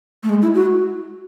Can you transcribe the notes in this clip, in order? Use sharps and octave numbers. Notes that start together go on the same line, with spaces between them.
A3
G#3
E4
F#4